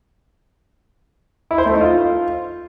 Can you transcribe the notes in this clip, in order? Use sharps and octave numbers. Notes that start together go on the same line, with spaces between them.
E4
C5
A3
D#4
F4